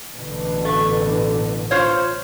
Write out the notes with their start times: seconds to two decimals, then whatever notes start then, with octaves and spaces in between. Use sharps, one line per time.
0.15 A1 B2 D3
0.65 A3
1.71 F4 C5 C#5